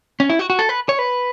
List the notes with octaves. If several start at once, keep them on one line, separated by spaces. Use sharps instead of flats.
C#4
E4
F#4
F#4
A4
B4
C#5
B4